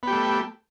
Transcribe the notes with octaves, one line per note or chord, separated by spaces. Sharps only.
A3 B3 G4